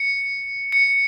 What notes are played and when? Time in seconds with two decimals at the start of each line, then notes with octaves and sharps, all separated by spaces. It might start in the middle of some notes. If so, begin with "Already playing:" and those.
Already playing: C#7
0.72 C#7